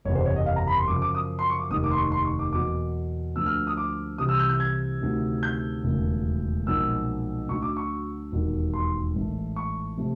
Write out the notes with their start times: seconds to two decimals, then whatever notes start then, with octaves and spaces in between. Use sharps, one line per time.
0.05 F#1 E2 C3 C#5
0.15 C5
0.26 C#5
0.36 D#5
0.46 F5
0.56 A#5
0.67 B5
0.77 C6
0.88 F#2 C#3 F3 D6
1.02 D6
1.15 D#6
1.39 C6
1.50 C#6
1.59 D6
1.70 F1 D#2 D#3 D#6
1.84 D6
1.91 C6
1.98 C#6
2.12 C6
2.25 C#6
2.39 D6
2.53 E2 B2 F#3 A#3 D6
3.36 D2 D3 F3 A#3 E6
3.46 F6
3.67 D#6
3.77 D6
4.18 C2 C3 E3 D#6
4.29 E6
4.39 G6
4.50 G6
4.60 G#6
5.01 D2 C3 D#3
5.43 G6
5.83 E1 D#2 C#3 F#3 A3
6.66 B1 A#2 F3 G#3 E6
7.49 D2 D3 F#3 C#6
7.62 D6
7.77 C#6
8.32 E1 D#2 D#3 F#3
8.74 C6
9.14 A1 G#2 E3 A3
9.56 C#6
9.97 C3 F3 A3